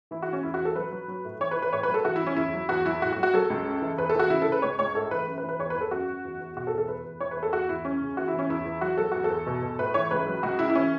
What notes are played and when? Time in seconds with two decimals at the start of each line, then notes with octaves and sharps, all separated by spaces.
0.11 E3 E4
0.22 F#4
0.28 E3 C#4
0.43 E2 E4
0.54 F#4
0.60 E3 A4
0.76 F#3 B4
0.91 F#3
1.08 F#3
1.25 A2
1.40 E3 C#5
1.51 B4
1.56 E3
1.62 B4
1.73 A2 C#5
1.83 B4
1.88 F#3
1.94 A4
2.05 E3 F#4
2.16 E4
2.21 F#2
2.26 C#4
2.36 E2 E4
2.54 F#3
2.69 E2 F#4
2.85 F#3 E4
3.01 A2 F#4
3.12 F#4
3.17 F#3
3.23 F#4
3.34 F#3 A4
3.50 C#2
3.65 F#2
3.82 E3
3.98 E2 B4
4.09 A4
4.15 E3 F#4
4.30 C#3 E4
4.42 A4
4.47 C#3
4.52 B4
4.62 C#2 C#5
4.79 C#2 C#5
4.95 A2 A4
5.11 E3 B4
5.27 F#2
5.38 B4
5.43 E3
5.49 B4
5.59 E2 C#5
5.70 B4
5.75 E2
5.81 A4
5.91 F#2 F#4
6.08 F#2
6.25 E2
6.40 E2
6.56 B2 F#4
6.67 A4
6.72 E2
6.78 A4
6.88 E2 B4
7.05 E2
7.20 E3 C#5
7.31 B4
7.36 E2
7.43 A4
7.53 E2 F#4
7.69 E2 E4
7.85 F#2 C#4
8.01 C#3
8.17 E3 F#4
8.28 E4
8.34 E3
8.39 C#4
8.49 E2 E4
8.66 E3
8.81 F#3 F#4
8.97 F#3 A4
9.12 E2 F#4
9.24 A4
9.30 E2
9.46 B2
9.62 B2
9.79 A2 B4
9.94 E3 C#5
10.11 C#2 B4
10.27 F#3
10.43 C#2 F#4
10.59 C#3 E4
10.70 E4
10.75 E3 C#4